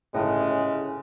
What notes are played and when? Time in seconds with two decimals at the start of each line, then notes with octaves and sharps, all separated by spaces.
0.15 G1 A2 C#3 G#3 C#4 E4